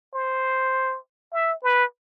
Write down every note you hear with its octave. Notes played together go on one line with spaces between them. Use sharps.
C5
E5
B4